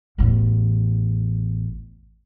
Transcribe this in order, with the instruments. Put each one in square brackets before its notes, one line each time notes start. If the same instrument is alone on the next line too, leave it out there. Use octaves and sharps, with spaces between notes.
[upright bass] A1 E2